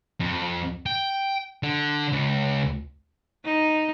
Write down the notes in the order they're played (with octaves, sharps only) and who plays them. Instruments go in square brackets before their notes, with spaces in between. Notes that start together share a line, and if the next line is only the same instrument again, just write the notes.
[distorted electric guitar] F2
G5
D3
C#2
[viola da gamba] D#4